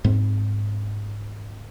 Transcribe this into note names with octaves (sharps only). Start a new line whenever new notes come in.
G#2 C4